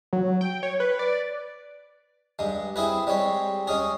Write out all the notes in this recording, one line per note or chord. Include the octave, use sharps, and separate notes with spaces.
F#3
G5
C#5
B4
D5
G2 G#3
C4 E4 G#4 B4
G3 G#3 C4 C#5
G#3 C#4 G#4